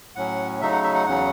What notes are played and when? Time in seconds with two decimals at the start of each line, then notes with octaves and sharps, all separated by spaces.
0.16 A2 F#3 C#4 F#5
0.61 C#3 F#3 A3 D#4 E5
0.72 F#5
0.83 E5
0.94 F#5
1.06 E2 C#3 F#3 C#4 F#5